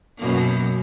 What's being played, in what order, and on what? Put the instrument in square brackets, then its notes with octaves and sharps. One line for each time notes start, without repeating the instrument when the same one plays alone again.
[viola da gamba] F#2 B2 A#3